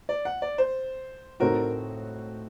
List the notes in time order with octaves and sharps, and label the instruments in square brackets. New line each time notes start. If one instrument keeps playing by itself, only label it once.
[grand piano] D5
F#5
D5
C5
[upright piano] A2 A3 C4 D#4 F#4 [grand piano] A#4